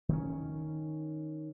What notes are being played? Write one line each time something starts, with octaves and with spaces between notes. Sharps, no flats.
D#3 C4 C#4